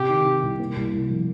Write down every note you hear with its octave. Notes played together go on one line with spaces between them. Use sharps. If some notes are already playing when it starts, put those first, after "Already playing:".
Already playing: C3 G4
D#3
D#3
C2
A#3
C2
C2
F3